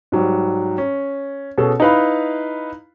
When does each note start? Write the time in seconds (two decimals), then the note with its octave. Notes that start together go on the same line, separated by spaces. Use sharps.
0.12 G#2 F#3 G3
0.78 C#4
1.58 B2 C#4 G#4 A4
1.80 D#4 E4 B4 F5 B5